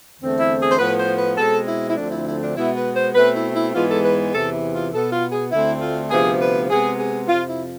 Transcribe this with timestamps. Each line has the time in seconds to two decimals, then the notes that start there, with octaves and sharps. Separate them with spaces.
0.20 E2 D3 A3 C4
0.40 E4
0.59 G#4
0.71 C5
0.78 A2 F3 B3 B4
0.98 C5
1.18 B4
1.38 B2 G#3 C4 A4
1.67 E4
1.88 E4
1.96 D2 D3 F3 A3 C4 D4
2.12 E4
2.26 E4
2.42 D4
2.56 B2 G#3 B3 E4
2.76 B4
2.95 C5
3.15 B2 A3 C4 B4
3.34 E4
3.55 E4
3.74 G#2 E3 G#3 B3 F4
3.89 A4
4.04 B4
4.33 E2 C3 E3 A4
4.53 E4
4.73 F4
4.93 B2 B3 A4
5.12 F4
5.31 G#4
5.51 D2 D3 A3 C4 E4
5.81 F4
6.10 D2 C3 F3 B3 G#4
6.40 B4
6.70 C3 G#3 B3 G#4
6.99 G#4
7.28 F2 C3 F3 F4
7.49 E4